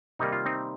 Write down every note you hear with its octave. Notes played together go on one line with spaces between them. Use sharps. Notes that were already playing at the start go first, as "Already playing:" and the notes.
C3 D#3 G3 A#3 D#4
F4
C4 D#4